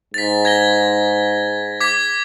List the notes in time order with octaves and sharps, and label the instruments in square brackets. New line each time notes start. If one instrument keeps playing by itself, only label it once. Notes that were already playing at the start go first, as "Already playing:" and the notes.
[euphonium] G#2 [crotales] A6 B6
[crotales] G#6 A#6 G7
D6 G#6 B6